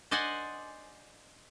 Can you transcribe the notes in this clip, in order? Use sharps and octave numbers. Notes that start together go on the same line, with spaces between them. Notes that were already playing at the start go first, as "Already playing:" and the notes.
C5 D5 D#5 F#5 G#5